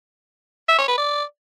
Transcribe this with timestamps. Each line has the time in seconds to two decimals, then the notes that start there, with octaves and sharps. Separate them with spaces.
0.68 E5
0.78 C#5
0.88 B4
0.98 D5